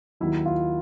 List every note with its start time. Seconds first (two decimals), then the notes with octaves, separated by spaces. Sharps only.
0.20 D#2 D#3 F#3 E4
0.46 F4